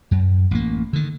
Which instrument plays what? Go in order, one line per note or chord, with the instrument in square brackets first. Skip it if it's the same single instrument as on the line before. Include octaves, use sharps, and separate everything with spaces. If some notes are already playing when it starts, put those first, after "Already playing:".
[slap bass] F#2
A1 A#3
D3 D#3